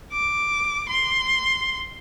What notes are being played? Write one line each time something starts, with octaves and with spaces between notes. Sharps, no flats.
D6
C6